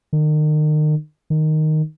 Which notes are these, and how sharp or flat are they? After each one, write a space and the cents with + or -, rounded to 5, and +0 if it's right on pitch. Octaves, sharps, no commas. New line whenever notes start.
D#3 -35
D#3 -5